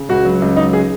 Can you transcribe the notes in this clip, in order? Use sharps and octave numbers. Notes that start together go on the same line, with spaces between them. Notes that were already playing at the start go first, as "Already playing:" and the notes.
Already playing: C#3
C#2 F#4
F#3
C#2
F#3 D#4
G#4